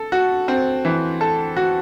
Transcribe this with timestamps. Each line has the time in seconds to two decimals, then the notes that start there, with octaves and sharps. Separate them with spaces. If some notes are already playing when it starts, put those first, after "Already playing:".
Already playing: A4
0.12 F#4
0.48 C4
0.85 E3
1.21 A4
1.56 F#4